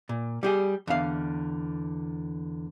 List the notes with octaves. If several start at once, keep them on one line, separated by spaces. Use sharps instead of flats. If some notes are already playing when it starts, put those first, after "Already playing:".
A#2
G3 G4 G#4
E2 D3 F5